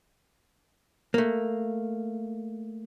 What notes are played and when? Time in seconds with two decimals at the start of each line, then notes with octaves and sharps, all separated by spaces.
1.14 A3 A#3